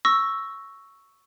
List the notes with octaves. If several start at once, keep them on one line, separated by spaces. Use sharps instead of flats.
C#6 E6 A#6